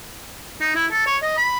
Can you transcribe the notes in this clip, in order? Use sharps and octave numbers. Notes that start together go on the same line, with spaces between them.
D#4
E4
A4
C#5
D#5
B5